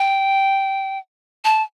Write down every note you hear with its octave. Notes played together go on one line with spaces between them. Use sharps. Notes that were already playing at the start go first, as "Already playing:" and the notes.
Already playing: G5
A5